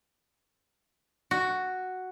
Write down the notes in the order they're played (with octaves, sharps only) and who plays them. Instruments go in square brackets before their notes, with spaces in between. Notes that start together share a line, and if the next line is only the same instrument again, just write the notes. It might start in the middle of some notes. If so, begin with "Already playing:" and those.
[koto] F#4